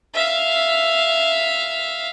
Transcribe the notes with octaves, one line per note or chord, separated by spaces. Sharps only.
E5 F5